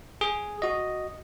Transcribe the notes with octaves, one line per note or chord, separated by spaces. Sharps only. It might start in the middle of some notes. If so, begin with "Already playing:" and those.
G#4
F#4 D#5